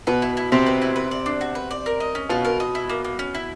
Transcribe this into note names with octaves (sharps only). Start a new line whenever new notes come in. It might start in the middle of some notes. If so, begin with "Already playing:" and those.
B2 B3 B4
E4
E4
C3 C4 G4
B4
E4
B4
D5
D4
F#4
B4
D5
A#4
D#5
C#4
B2 B3 F4
A#4
D#5
E4
A#3
A#3
C#4
E4